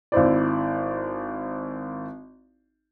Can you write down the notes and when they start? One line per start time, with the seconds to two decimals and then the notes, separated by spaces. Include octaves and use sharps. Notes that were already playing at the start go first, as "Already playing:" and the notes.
0.12 G#1 E4 C5 D5